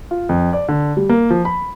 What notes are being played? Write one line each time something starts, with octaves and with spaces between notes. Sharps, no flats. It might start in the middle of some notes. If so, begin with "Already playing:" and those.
F4
F2
D5
D3
G3
A#3
F3
B5